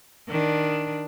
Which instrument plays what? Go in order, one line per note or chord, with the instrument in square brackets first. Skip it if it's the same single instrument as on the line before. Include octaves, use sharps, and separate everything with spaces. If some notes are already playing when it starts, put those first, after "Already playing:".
[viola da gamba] D#3 D4